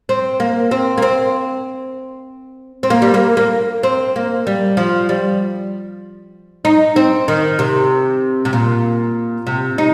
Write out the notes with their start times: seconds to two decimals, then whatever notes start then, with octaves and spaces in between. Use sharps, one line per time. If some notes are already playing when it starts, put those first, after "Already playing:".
0.09 C4
0.40 A#3
0.71 C4
0.98 A#3
1.02 C4
2.83 C4
2.90 A#3
3.02 G3
3.14 A#3
3.37 A#3
3.83 C4
4.16 A#3
4.47 G3
4.77 F3
5.09 G3
6.65 D#4
6.96 C4
7.28 D#3
7.59 C3
8.45 C3
8.53 A#2
9.47 C3
9.78 D#4